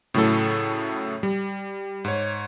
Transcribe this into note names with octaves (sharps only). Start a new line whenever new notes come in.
A2 C#3 F#3 A3 E4 A4
G3
G#2 C#5